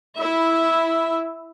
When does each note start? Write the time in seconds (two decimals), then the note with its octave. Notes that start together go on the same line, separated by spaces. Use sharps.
0.20 E4 E5